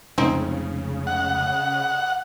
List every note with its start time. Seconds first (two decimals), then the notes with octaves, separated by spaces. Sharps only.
0.18 F1 C#2 C#3 C4 D#4 E4
1.07 F#5